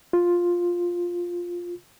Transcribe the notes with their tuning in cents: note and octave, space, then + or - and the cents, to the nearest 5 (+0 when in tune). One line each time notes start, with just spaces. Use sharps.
F4 +5